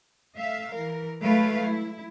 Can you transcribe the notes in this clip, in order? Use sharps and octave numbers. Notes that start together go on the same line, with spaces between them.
A3 E5 F5
E3 A#4
F#3 G#3 A3 E4 B4 F5
E4